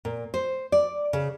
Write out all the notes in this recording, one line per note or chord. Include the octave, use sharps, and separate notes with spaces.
A#2
C5
D5
C#3